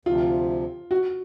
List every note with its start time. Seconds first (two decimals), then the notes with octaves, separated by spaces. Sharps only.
0.05 D2 C3 F3 F4
0.91 F#4